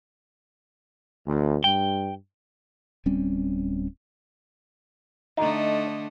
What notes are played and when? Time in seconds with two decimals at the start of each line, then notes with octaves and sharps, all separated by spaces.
1.26 D2
1.64 G2 G5
3.06 D1 G3 C4 C#4
5.37 D3 A3 D#4 D#5